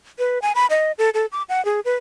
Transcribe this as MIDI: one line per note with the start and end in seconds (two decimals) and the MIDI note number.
0.19 0.41 71
0.42 0.52 80
0.55 0.66 83
0.70 0.92 75
0.98 1.10 69
1.14 1.26 69
1.32 1.43 86
1.49 1.64 78
1.65 1.80 68
1.85 1.96 71